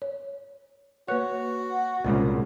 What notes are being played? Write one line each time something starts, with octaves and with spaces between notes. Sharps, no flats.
C#5
A#3 F#4 B4 C#5 F#6
C2 A#2 C#3 G#3 C#4